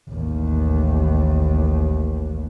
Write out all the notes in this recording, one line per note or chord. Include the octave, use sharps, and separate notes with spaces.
A1 D#2